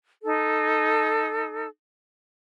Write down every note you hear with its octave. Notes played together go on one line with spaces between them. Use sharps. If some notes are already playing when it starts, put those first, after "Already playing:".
D#4 A4